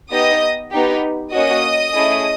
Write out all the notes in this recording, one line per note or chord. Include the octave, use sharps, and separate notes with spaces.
B3 D#4 G4 D#5 D#6
B3 D#4 G4
A#3 C#4 F#4 D#5 D#6
A3 C#4 E4 G#4